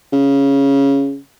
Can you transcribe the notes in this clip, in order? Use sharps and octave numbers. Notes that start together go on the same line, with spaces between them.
C#3